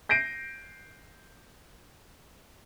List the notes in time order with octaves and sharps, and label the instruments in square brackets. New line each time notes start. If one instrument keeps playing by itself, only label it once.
[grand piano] G6 A#6 C7 D7 D#7